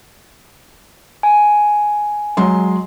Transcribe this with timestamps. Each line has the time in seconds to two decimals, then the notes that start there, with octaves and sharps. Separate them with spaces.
1.23 G#5
2.37 F#3 G#3 C6